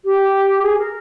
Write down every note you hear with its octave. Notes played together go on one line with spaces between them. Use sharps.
G4
G#4
A#4